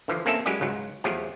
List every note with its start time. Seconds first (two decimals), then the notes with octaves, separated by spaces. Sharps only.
0.08 D3 E3 F3
0.26 A#3 C4 C#4 A4 E5
0.46 F#3 G#3 C#4 E4 G4 D5
0.61 C#2 G#2 F#3
1.04 E2 F3 F#3 A3 G4 G#4